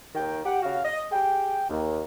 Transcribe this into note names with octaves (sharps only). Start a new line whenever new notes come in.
D#2 D#3 G5
G4 F#5
C#3 F#4 F5
D#5
G4 G#4 G5
D#2